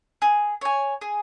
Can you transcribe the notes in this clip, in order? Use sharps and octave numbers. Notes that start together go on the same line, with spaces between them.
G#4
C#5 G#5
G#4